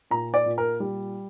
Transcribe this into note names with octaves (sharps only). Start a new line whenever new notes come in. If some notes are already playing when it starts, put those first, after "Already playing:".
A#2 A#5
D5
A#2
A#4
G3